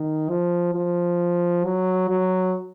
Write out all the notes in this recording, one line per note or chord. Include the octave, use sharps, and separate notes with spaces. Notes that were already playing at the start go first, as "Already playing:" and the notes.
Already playing: D#3
F3
F3
F#3
F#3